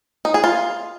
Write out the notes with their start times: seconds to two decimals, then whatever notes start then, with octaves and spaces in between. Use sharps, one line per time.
0.25 D#4
0.34 G#4
0.44 F4